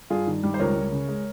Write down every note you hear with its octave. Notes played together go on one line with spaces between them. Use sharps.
G2 F4 G#4
D#3
G3
C5
C#2 A#4 C#5
C#2
C#3
G#3